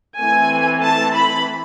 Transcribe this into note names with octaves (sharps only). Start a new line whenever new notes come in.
E3 A3 C4 G#5
A5
B5